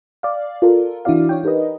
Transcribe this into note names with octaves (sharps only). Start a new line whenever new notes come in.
D5 F5
F4 A4 A#4
E3 D4 E4 F#4 D5 F5
D4 C#5 G5
D#4 G4 A#4 B4 D#5